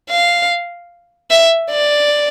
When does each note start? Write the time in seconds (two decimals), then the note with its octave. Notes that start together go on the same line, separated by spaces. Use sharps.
0.09 F5
1.30 E5
1.71 D5